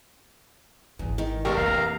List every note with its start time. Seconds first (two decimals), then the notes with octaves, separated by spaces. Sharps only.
0.99 G#1 E2 E3
1.18 D#3
1.45 F1 A#1 G4 A#4 D5 C#6
1.57 E3 F4 F5 A#5